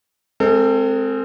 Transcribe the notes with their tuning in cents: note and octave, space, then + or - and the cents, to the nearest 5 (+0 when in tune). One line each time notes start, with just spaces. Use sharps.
G#3 +15 C4 +0 A4 +45